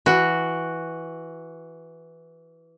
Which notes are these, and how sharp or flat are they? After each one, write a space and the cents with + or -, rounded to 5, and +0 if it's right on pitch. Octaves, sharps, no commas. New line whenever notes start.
E3 +0 F#4 +0